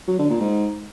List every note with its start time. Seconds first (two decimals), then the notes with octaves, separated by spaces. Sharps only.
0.07 F#3
0.19 D3
0.30 A#2
0.41 G#2